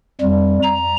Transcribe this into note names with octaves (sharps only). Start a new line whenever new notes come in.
F2 G3
A#5